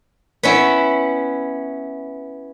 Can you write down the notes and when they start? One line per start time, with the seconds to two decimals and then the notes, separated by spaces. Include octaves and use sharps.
0.43 B3 C#4 E4